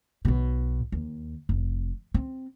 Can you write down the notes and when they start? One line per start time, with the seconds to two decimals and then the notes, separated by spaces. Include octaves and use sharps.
0.25 B1 B2
0.92 D#2
1.49 F1
2.14 C4